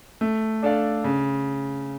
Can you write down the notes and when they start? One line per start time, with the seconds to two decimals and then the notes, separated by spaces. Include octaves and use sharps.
0.21 A3
0.62 D4 A4 D5 F5
1.04 C#3